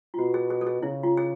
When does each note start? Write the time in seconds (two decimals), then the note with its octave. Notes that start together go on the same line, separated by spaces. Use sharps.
0.14 F4
0.19 B2 F#4
0.34 G#4
0.50 G#4
0.61 A4
0.66 G#4
0.82 C#3 E4
1.03 F4
1.17 G#4